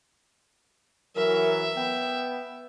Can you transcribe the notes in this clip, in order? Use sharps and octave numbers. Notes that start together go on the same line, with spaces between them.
E3 F#3 A#4 E5
B3 G5